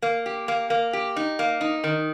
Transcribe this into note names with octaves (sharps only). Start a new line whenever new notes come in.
A#3
G4
A#3
A#3
G4
D#4
A#3
D#4
D#3